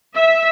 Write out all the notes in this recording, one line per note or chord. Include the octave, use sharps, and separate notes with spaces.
E5